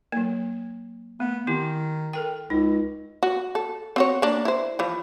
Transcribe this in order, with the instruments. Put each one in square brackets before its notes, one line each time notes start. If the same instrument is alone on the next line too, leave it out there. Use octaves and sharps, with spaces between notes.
[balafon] F#3 A#3
[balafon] A3 [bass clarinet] B3
[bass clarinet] D#3 [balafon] C4 E4 G4
[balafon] A4 A#4 G5
[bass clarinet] C#2 [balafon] D#4
[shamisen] F#4
A4
C4 F#4 C#5
A#3 D4
E4 C5
E3 F3